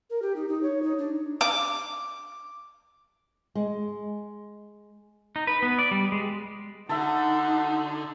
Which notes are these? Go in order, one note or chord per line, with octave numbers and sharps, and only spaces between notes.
A#4
G4
D#4
D#4
C#5
D#4
D4
D6
G#3
D#4
B4
B3
D5
G3
G#3
D3 D#4 F#4 A4 E5